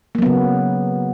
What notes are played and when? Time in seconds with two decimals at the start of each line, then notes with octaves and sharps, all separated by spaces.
0.15 A#3
0.18 F#3
0.22 B3
0.26 C#3